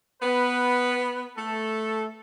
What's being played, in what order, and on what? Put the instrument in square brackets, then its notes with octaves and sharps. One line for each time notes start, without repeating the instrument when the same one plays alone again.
[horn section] B3 B4
A3 A4